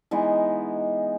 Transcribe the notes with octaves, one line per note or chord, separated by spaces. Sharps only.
E3 G#3 B3 D#4